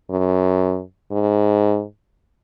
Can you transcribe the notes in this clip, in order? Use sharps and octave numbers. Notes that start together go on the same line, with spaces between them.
F#2
G#2